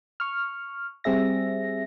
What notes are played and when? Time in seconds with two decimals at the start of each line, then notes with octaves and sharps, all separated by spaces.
0.20 C#6 F6
1.04 G3 C4 G#4 E5 A#6